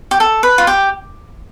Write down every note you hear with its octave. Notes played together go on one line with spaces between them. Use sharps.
G4
A4
B4
F4
G4